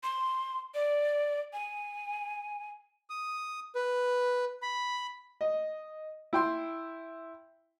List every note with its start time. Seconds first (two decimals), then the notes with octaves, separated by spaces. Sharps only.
0.03 C6
0.74 D5
1.53 G#5
3.10 D#6
3.75 B4
4.62 B5
5.41 D#5
6.33 E4 G5 C6